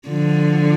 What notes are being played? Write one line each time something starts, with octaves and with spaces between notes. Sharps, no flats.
D3 F3